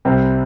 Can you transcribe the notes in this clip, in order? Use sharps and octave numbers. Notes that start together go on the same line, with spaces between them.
C2 C3 G3 C4